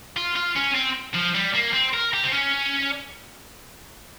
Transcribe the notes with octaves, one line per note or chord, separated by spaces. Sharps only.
F4
F4
C#4
C4
F3
G3
A#3
C4
A#4
G4
C4
C#4